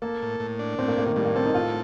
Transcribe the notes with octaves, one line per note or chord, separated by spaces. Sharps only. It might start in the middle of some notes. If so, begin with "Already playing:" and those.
A#3 A4
A2
A2
D4
A2 C4
A#3
A2 A#3
D#3
A2 G3
A#3
C4 A4
D#4
A2 F4